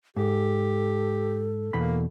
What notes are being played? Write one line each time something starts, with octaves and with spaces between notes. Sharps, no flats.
G#2 G4 A4
E2 B2 A#3 B5